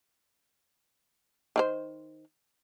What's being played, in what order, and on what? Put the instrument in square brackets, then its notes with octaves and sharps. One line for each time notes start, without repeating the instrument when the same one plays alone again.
[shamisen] D#3 E4 C5